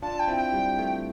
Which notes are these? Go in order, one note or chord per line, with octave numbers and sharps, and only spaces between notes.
D4 F4 A5
G5
C4 E4
G5
G3
A3